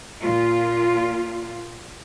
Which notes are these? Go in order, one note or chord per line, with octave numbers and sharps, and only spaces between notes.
A#2 F4